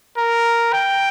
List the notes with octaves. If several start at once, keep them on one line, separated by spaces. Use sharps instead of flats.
A#4
G5